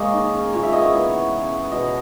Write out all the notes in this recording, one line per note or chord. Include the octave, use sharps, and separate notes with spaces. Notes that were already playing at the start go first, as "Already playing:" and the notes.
Already playing: G#3 A#3 C#5 D#5
D#3
C#4
A#2 C#5
E5
B3 D#5
C#5
E3
B3
C#3
B3
B2 D#5